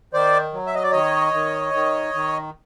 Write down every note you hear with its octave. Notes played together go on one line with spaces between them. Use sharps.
D#3 C5 D5
F#3
E5
D#5
D5
D#3 C#5 D#5
D#3
D#3
D#3